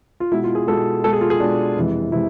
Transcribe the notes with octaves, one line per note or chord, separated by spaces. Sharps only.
F4
B2 G#3 E4
F4
G#4
B2 G#3 A4
B2 G#3 A4
G#4
F4
G#4
B2 G#3 D4
F2 C3 E3 G#3
C3 E3 G#3 E4